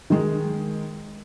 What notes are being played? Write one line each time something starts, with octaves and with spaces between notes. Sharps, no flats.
D#3 G#3